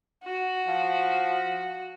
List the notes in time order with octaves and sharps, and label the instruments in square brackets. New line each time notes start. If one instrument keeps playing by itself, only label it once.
[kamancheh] F#4
[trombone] F3